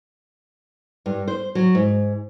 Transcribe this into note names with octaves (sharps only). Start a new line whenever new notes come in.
G2
C5
F#3
G#2